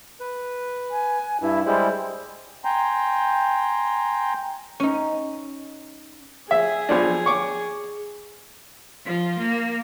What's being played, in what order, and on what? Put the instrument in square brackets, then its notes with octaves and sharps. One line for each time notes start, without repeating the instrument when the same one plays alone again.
[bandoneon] B4
[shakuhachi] G#5
[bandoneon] G2 [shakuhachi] E4
[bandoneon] G3 G#3 E4 [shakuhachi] C5
[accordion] G5 G#5 A#5 C6
[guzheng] C#4 D#4
[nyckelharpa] G#4 [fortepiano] E5
[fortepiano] B1 F3 D4
C#6 D6
[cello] F3 F4
A#3